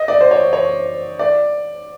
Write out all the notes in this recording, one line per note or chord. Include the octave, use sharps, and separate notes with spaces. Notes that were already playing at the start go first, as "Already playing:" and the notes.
Already playing: D#5
D5
C5
C#5
C#5
D5